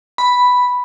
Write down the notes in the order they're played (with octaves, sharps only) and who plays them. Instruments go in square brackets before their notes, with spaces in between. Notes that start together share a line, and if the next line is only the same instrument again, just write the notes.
[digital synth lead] B5